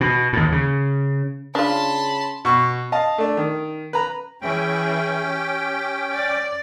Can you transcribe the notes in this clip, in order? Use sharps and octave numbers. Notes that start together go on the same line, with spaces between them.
B2
D#2 A2
C#3
C#3 D4 F4 A5 B5 C6
B2 C#6
D#5 F5 A5
A3 D4
D#3
B4 A#5
E3 C#4 G#4 G5
G4
D5